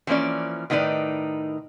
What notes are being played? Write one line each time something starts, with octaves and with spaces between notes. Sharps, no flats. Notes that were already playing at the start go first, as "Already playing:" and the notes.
E3 F3 A#3 C#4 D5
A2 D#3 B3 D#4 B4 D5